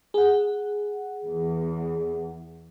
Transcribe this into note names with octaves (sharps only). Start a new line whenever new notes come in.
G#4 F#5
E2